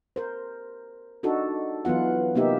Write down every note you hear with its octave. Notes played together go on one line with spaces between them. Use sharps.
A#4 C5
D4 D#4 F#4 A4
E3 F#3 B3 F4 F#5
C3 A#3 B3 D#4 G4 E5